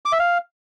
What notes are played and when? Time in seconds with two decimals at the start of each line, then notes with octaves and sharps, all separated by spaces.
0.06 D6
0.12 E5
0.19 F5